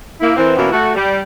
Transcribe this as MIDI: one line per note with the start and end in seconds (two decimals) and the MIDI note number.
0.21 0.35 58
0.21 0.35 64
0.36 0.54 52
0.36 0.54 60
0.36 0.54 70
0.56 0.70 47
0.56 0.70 52
0.56 0.70 58
0.56 0.70 59
0.56 0.70 61
0.56 0.70 64
0.72 0.92 57
0.72 0.92 66
0.95 1.19 55